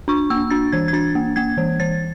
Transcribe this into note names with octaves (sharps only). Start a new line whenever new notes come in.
D4 C#6
A#3 E6
D4 A6
E3 G#6
G#6
D4 A6
A#3
A#3 G#6
E3
E3 A6